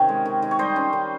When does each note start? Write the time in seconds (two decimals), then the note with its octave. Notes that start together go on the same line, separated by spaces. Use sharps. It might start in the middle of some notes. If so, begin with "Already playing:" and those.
Already playing: C3 D#3 C#4 A#4 C#5
0.09 G#3
0.25 D#3
0.42 D#3
0.51 C#5
0.59 G3 C5 D#5
0.76 C#4
0.93 D#3